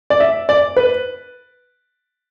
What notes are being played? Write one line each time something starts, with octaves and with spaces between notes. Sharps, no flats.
D5
E5
D5
B4